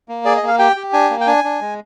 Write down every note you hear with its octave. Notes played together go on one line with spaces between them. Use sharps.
A#3
G#4 D5
D#5
A#3 F5
G4 G5
G4
D4 G#5
A#3
G5
D4 G#5
D4
G#3